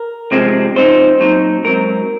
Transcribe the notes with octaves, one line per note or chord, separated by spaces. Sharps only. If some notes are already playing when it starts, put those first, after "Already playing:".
Already playing: A#4
C2 C3 F3 G#3 C4
C3 F3 C4 D#4 C5
A#2 F#3 C4 D#4
G#2 F#3 C4 A#4